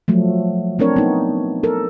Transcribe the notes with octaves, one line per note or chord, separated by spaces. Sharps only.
F3 F#3 A3
A3 C4 D4 A#4 C#5
B3 D#4
A4 A#4